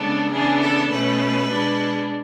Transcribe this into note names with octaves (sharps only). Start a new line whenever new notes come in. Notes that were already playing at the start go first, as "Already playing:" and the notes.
Already playing: C#3 G#3 B3 D4 A4
C#3 E3 B3 D4 G#4
A4
B2 A3 C#4 B4
B2 G#3 D4